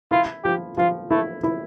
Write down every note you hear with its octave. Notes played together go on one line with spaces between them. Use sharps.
E4 F4
F3 G4
F3 F4
A3 E4
E4